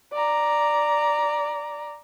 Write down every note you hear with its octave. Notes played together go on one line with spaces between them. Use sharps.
D5 A#5